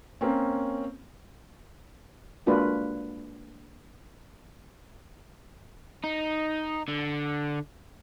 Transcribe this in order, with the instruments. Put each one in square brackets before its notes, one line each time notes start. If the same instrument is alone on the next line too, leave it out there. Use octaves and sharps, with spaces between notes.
[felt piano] A#3 C4 C#4
[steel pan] G#3 A#3 D4 F4 F#4 B4
[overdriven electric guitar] D#4
D3